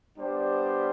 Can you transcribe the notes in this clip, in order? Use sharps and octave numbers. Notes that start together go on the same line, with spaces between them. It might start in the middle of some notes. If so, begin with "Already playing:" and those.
G3 B3 D4 G4 C5